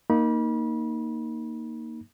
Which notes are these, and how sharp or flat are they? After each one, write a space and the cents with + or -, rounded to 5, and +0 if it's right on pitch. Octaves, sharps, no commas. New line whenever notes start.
A#3 +0 D#4 +0 B5 -35